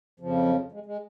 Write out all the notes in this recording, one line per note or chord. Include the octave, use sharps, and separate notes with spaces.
F2 C#3 F3
F#3
G#3
G#3